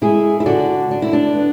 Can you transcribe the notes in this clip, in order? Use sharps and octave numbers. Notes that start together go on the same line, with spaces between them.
G#3 E4 G#4
E4
D3 D4 F#4
D3 D4
E4
D4
B3